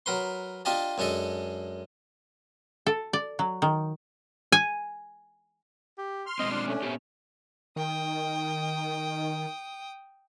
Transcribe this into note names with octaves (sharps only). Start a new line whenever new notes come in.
F#3 A#4 B4 C6
D4 F4 G4 D#5 A5
F#2 G#3 D4 A4 D#5
A4
D5
F#3
D#3
G#5
G4
C6 F6
B2 G#3 C4 D#5
D4
A3 C#4
A#2 B3 G4
D#3 G5 D#6